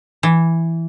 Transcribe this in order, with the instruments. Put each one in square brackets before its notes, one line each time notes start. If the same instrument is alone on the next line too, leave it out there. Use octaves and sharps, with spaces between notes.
[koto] E3